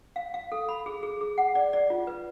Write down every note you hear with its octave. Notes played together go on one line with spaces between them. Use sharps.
F5
F5
A4
B5
G#4
G#4
G#4
F#5
D5
D5
F4
B4